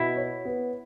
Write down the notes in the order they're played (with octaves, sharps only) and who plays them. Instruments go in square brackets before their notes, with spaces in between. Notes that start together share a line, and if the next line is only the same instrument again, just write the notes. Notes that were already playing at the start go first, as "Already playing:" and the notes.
Already playing: [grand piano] B2 F#4 [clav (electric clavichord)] E4
[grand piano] C#5
B3